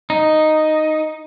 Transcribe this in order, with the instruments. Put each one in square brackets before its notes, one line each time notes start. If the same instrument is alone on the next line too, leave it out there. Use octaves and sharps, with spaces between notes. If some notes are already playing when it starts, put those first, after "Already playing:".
[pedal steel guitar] D#4